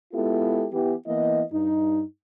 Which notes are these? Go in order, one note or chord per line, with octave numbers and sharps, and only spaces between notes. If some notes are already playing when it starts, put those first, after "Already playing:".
G#3 B3 E4 F4 G4 A4
E3 B3 G4
E3 A#3 B3 E4 D#5
G2 D#4